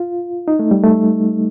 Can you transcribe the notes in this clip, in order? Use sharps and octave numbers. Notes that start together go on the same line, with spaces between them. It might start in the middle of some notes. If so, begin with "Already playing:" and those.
Already playing: F4
D#4
A3
G3
A3